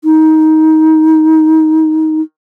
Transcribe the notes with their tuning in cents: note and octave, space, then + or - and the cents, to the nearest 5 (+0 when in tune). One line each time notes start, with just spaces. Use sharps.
D#4 +20